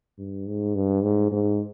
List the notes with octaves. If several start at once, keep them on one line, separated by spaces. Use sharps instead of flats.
G2
G#2
G2
G#2
G#2